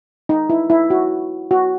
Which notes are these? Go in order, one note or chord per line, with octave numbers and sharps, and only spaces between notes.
D#4
E4
E4
F#4
F#4